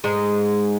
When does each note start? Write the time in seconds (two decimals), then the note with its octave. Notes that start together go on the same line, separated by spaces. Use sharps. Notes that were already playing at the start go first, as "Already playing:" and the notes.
0.04 G#2 G#3